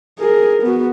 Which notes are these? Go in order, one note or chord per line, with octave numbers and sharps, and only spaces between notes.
G#4 A#4
B3 F#4